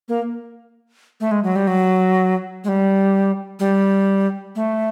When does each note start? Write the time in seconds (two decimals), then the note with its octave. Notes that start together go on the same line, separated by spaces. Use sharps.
0.09 A#3
1.20 A3
1.31 G#3
1.44 F#3
1.56 G3
1.67 F#3
2.64 G#3
2.68 G3
3.60 G3
4.56 A3